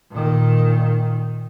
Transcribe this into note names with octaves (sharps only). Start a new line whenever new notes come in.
A#2 D#3